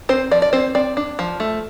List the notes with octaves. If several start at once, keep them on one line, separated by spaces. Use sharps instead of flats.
C4 C5
F3 D5
D5
C4 C5
C4 D5
D4
F3
A3